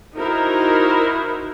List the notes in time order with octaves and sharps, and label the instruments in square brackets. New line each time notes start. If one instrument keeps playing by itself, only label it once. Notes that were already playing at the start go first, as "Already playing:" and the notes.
[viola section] D#4 E4 F#4 A#4 C5